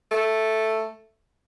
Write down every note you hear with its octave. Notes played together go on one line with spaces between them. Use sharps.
A3